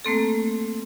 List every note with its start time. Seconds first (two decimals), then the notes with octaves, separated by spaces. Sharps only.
0.05 A3 A#3 C4 A4